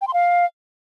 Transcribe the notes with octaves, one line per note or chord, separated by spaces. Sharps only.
G5
C6
F5